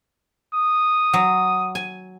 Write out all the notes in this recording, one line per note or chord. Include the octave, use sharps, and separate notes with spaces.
D#6
F#3
G#5